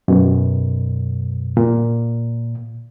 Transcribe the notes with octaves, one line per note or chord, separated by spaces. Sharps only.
F#2 B2
A#2